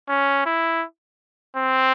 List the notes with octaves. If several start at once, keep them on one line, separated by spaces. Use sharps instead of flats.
C#4
E4
C4